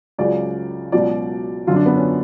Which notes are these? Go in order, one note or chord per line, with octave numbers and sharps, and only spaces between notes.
C#2 C#3 F#3 D5
C#2 B2 F#3 D5
F#2 D3 F#3 F4
D4
B3
C#4